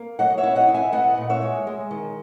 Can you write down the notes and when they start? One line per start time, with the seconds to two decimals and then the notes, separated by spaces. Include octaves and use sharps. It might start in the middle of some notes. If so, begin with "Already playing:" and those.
Already playing: A#3
0.19 F#3 D#5 F#5
0.38 C#5 E5
0.43 E4
0.55 D#5 F#5
0.69 E4
0.74 E5 G#5
0.92 B3 D#5 F#5
1.18 A#2
1.30 C#5 E5
1.42 G#3
1.67 G#3
1.91 D#3